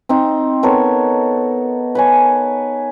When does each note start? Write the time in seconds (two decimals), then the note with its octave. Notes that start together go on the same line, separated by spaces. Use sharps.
0.09 C4 D#4
0.63 B3 A4 A#4 C#5
1.95 B4 C#5 G#5